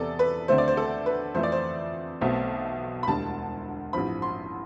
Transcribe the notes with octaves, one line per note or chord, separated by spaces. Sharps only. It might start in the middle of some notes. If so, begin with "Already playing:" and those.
Already playing: E2 C3 E3 B3 A4 D5
B4
D2 D3 A3 C4 C5
D5
C5
A4
B4
F2 E3 A3 C4 C5
D5
C5
B1 B2 A3 C4
B5
E1 D2 D3 G3 A5
A1 G2 F3 C4 B5
C6